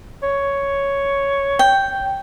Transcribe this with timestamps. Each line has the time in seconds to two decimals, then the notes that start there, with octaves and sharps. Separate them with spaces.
0.23 C#5
1.59 G5